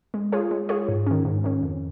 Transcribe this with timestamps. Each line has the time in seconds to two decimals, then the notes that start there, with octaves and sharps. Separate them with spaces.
0.14 G#3
0.32 F4 G#4 C#5
0.51 G#3
0.69 F4 G#4 C#5
0.88 G#2
1.06 D#3 C#4
1.25 G#2
1.44 D#3 C#4
1.62 F2